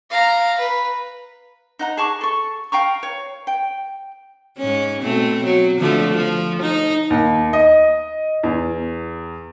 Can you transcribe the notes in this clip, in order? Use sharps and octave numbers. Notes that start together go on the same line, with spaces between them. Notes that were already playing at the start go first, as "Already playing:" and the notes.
F5 A#5
B4
D#4 F#5 A#5
G#4 A5 C#6 D6
A4 C#6
F5 G5 A#5 C#6
C#5
G5
G#2 C#4
B2 A3 C4
F#3
D3 F3 A3
F3
D#4
D#2
D#5
E2